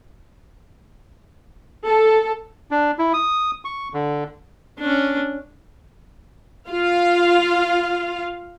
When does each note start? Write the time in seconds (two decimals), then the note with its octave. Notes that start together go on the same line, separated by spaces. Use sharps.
1.86 A4
2.71 D4
2.99 E4
3.14 D#6
3.65 C#6
3.94 D3
4.79 C#4 D4
6.70 F4 F5